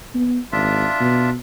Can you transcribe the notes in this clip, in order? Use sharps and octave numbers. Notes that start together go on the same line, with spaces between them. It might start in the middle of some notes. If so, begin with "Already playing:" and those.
B3
G#1 D4 F4 E5
B2